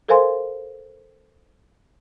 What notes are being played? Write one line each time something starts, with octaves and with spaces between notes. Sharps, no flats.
A4 A#4 C5 F5 G#5 C6